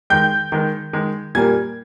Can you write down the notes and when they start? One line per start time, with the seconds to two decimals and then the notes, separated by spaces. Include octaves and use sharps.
0.10 D#3 G#3 G5 G6
0.52 D#3 G#3
0.93 D#3 G#3
1.35 A#2 G3 A#3 G#5 G#6